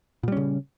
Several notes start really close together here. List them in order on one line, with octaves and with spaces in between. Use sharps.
A#2 G3 C#4 C#3